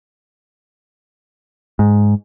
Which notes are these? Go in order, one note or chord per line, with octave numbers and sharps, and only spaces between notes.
G#2